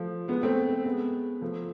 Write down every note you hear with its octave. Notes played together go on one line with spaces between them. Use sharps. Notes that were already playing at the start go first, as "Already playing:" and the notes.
Already playing: F3 A3
G#3 B3
A3 C4
G#3 B3
F3 A3